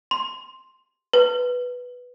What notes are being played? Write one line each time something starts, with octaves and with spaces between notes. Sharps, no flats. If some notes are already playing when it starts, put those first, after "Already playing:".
C6
B4